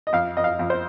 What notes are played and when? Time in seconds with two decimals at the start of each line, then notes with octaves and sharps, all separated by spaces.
0.07 D#5
0.13 F2 F5
0.37 F2 D#5
0.44 F5
0.59 F2
0.70 C5